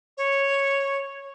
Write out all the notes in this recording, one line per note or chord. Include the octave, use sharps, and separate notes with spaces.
C#5